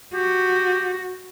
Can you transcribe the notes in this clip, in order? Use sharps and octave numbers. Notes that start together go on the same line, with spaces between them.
F#4 G4